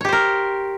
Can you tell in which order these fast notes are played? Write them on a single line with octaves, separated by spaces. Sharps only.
C#5 G4 C5 A#4